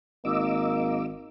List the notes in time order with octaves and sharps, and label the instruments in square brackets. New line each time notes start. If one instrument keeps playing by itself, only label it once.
[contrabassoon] G#1 [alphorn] A#3 [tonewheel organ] D#5 D6 E6